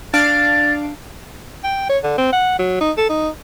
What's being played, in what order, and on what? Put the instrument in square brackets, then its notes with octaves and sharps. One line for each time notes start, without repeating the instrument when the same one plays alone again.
[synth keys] D4 F5 D7 [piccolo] A6
[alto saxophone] G5
C#5
D3
C4
F#5
F#3
D#4
A4
D#4